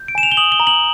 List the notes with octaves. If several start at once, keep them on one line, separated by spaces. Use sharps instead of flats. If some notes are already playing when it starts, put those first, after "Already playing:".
Already playing: G6
D7
G#5 E7
F7
G7
D#6 F#7
G7
A#5
F#7